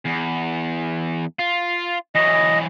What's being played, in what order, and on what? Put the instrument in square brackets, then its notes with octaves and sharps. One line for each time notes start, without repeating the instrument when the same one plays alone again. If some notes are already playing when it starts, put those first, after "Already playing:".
[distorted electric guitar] E2
F4
[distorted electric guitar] E3 F#3 [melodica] D#5